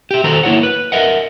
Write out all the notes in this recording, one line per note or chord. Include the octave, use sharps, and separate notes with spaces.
G4 E5
D#3 F#4 A4 C5 A#5
A#3 E4 C#5 F#5
B4
A#4 D#5 E5 F#5